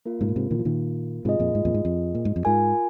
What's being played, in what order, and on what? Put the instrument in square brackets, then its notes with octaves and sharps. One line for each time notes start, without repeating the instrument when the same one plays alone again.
[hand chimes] A#3 F4 A#4
[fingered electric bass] G#2 C3
A#2
G#2 C3
A#2 D#3
F3
A#2 D#3
[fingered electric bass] G#2 C3 [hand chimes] F4 G#4 D#5
[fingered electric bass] F2 A#2
G#2
F2 A#2
G#2
F2
A#2
G#2
F2
[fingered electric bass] G#2 [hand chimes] F4 A#4 G#5